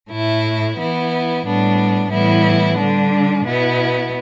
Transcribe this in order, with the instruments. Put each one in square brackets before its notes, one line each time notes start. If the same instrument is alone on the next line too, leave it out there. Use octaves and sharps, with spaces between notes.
[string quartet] A2 A3 E4
E3 B3 E4
A2 G3 B3 D4
A2 E3 G3 B3 E4
D3 G3 D4
B2 B3 E4